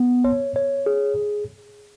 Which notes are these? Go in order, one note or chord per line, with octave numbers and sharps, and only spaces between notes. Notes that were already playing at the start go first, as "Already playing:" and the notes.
Already playing: B3
C#5
C#5
G#4